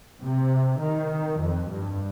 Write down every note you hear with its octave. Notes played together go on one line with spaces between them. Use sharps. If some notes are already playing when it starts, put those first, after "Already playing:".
C3
D#3
F2
G2